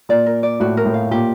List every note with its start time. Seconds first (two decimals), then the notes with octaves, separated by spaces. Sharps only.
0.09 A#2 D5
0.26 A#4
0.43 D5
0.60 A2 F#4
0.77 A#4
0.85 A2
0.94 F5
1.11 A#2 G4